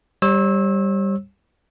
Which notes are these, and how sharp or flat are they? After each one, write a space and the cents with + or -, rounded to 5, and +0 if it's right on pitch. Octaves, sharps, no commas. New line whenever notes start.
G3 +5 C#5 -45 E6 -15